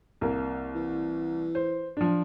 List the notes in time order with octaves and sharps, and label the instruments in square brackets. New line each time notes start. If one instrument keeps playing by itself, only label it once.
[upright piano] C2 A#3
[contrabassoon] E3
[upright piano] C5
F3 D4